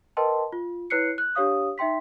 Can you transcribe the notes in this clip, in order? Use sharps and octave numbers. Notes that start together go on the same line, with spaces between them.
A#4 B4 D#5 G5 A5 C6
F4
E4 B4 C#5 F#6 C7 C#7
F#6
D4 G4 C#5 F5 D#6
D#4 E5 G5 C6 B6